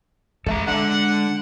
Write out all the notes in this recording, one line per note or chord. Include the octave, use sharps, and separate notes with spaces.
G#3 A4 E5 A#5
D4 A4 F#5